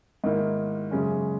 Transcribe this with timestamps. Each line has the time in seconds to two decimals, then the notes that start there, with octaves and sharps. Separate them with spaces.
0.24 G#2 D#3 A#3 E4
0.91 F#2 C#3 G#3 C#4